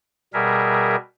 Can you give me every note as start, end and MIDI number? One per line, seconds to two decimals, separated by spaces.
0.34 0.96 47
0.34 0.96 55
0.34 0.96 68
0.34 0.96 70
0.34 0.96 76